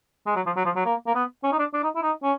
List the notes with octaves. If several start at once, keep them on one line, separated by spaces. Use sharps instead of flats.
G#3
F#3
F3
F#3
F3
F#3
A#3
A#3
B3
C#4
D#4
D4
D4
D#4
E4
D#4
C#4